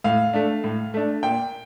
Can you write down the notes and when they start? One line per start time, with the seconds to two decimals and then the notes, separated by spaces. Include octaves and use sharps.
0.04 A2 F5
0.33 A3 D4
0.64 A2
0.94 A3 D4
1.23 A#2 G5